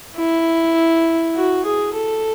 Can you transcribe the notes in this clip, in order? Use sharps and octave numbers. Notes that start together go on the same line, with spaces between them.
E4
F#4
G#4
A4